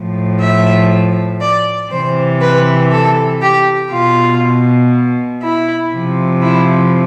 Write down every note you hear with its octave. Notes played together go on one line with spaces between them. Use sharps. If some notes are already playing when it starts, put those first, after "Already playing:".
Already playing: A2 F3
E5
D5
C3 E3 C5
B4
A4
G4
B2 F4
E4
C3 F3
E4